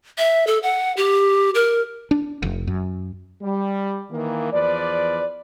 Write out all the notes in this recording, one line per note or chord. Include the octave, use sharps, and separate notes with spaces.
E5
A4
F#5
G4
A#4
D4
F1
F#2
G3
D#3 E3 A#3
E2 F3 B4 D5